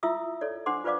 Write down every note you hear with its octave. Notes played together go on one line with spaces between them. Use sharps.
E4 F4 E5 D#6 E6
A4 C#5 D5
D4 C5 F#5 C6 D6
F4 B4 C5 D5 F5 D6